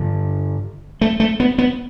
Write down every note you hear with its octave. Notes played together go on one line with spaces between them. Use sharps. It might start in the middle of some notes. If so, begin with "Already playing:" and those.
Already playing: G2 D3
A3
A3
B3
B3